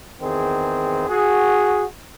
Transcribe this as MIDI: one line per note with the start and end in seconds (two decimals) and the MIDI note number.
0.22 1.09 40
0.22 1.09 51
0.22 1.09 60
0.22 1.09 68
1.09 1.84 66
1.09 1.84 68